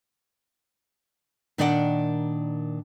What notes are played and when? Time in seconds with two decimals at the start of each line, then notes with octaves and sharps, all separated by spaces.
1.58 A#2 D#3 D4 D5 F#5 G5